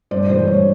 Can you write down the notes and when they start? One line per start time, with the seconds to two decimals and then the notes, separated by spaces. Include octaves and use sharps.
0.11 G2 C5 D5
0.29 E3 G#3 C5
0.47 G2 C#5